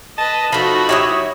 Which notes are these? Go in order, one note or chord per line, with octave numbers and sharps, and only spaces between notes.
B4 D#5 A5
F3 A3 D#4 F#4 B5
F#3 E4 G4 C#5 E5 D#6